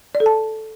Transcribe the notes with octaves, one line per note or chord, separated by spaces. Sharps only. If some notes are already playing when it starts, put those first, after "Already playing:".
D5
A4
A5